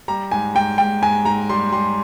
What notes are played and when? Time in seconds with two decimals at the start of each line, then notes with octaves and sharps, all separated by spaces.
0.08 G3 A#5
0.31 G#2 G#5
0.55 G#2 G5
0.78 G#2 G5
1.02 G#2 G#5
1.25 G#2 A#5
1.49 G3 C6
1.72 G3 C6